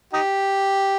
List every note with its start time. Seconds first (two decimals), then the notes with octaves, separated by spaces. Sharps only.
0.13 D#4 G4